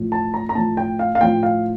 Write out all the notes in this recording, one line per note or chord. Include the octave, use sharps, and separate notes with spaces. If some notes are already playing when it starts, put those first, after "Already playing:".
Already playing: A2 F3
A5
A#5
A#5
A2 F3 A5
G5
F5
F5
A2 F3 G5
F5